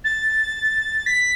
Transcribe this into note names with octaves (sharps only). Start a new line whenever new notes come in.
A6
B6